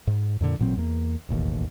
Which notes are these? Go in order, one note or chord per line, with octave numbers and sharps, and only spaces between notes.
G#2
F2 A#2 D3
A1 A#2 F#3 C4
E2 A#3
E1 A1 D#2